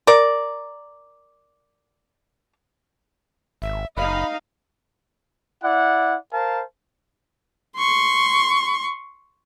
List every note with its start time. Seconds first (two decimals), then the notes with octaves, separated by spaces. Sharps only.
0.07 A#4 D5
3.62 G#1 E5
3.97 F#1 D#4 D#5 F5 B5
5.62 E4 D5 F#5
6.32 A#4 C5 F5 A5
7.77 C6 C#6